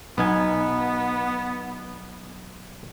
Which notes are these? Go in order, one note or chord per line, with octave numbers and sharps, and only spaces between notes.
B1 B3 D#4 G#5